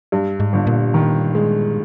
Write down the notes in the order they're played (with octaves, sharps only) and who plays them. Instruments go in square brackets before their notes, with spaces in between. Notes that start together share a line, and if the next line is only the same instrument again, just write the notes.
[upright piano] G2
[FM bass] G#2
[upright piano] G1
[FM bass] A#2
[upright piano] D#3
G#3